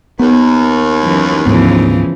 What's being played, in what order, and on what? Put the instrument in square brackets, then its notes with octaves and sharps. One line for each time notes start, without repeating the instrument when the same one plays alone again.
[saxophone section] D#2 [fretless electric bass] B3
[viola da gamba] F#2 E3
[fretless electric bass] D2 G#2 B3 [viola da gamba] C#3 E3 F3